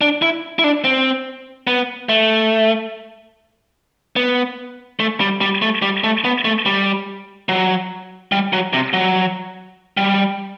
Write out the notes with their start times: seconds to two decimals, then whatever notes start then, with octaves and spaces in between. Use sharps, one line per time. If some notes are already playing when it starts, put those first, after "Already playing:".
0.01 D4
0.22 E4
0.59 E4
0.64 D4
0.84 C4
1.67 B3
2.09 A3
4.16 B3
5.00 A3
5.20 G3
5.41 G3
5.62 A3
5.82 G3
6.04 A3
6.25 B3
6.45 A3
6.66 G3
7.49 F#3
8.32 G3
8.53 F#3
8.73 C3
8.93 F#3
9.97 G3